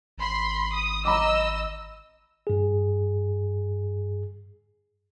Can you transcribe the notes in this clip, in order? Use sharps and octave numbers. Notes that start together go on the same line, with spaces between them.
G#1 B5 C6
D#6
D#5 A#5 B5 D6 E6
G2 G#4